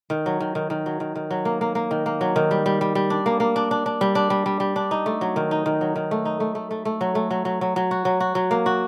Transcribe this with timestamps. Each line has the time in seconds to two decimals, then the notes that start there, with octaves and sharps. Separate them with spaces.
0.10 D#3
0.26 F#3
0.40 D#3
0.55 D#3
0.70 D#3
0.86 F#3
1.00 D#3
1.15 D#3
1.31 F#3
1.45 A#3
1.61 A#3
1.75 A#3
1.91 D#3
2.06 A#3
2.21 F#3
2.36 D#3
2.51 G3
2.66 G3
2.81 G3
2.95 G3
3.10 D4
3.26 A#3
3.40 A#3
3.56 D4
3.71 D4
3.86 D4
4.01 G3
4.15 D4
4.30 G3
4.46 G3
4.60 G3
4.76 D4
4.91 D#4
5.06 A3
5.21 F#3
5.36 D#3
5.51 D#4
5.66 D#3
5.81 F#3
5.96 D#3
6.11 A3
6.25 D#4
6.40 A3
6.55 A3
6.71 A3
6.85 A3
7.01 F#3
7.15 A3
7.31 F#3
7.45 F#3
7.61 F#3
7.76 F#3
7.91 F#4
8.05 F#3
8.20 F#4
8.35 F#3
8.51 A#3
8.66 F#4